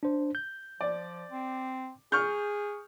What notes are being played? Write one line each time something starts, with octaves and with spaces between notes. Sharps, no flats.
D4 C5
G6
F3 D5
C4
G#4 C#6 F6 G6